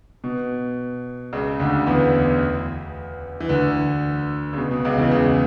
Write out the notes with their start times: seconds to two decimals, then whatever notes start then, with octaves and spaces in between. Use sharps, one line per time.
0.24 B2
1.33 C#2 C#3
1.60 D2 D3
1.87 E2 E3
3.41 E3
3.49 D2 D3
4.53 C#3
4.58 B2
4.71 B2
4.85 C#2 C#3
4.98 E2 E3
5.12 C#2 C#3